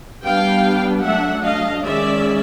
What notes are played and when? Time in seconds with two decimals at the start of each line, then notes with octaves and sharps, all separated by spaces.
0.24 G3 B3 D4 F5 G5
1.04 F#3 A3 D4 E5 F#5
1.44 D#5 F5
1.85 D#3 G#3 C#4 D5 E5